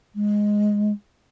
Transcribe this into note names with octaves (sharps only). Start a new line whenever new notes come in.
G#3